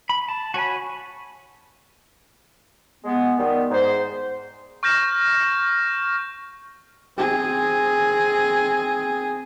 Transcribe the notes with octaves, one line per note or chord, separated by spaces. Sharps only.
B5
A5
F#4 C#5 G#5 B5
G#3 B3
D#3 G3 B3
G#2 C5
C#6 F6 G6 A#6 E7
C4 G#4